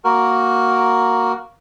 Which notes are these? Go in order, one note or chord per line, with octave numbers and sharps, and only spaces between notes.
A#3 F#4 A#4